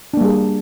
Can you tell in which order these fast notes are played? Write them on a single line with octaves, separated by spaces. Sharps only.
D4 A#3 G3 G#4